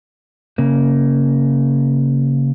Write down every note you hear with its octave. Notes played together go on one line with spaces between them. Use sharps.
C#3 A#3